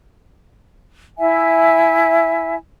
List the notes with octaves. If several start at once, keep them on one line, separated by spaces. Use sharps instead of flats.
E4 E5 G#5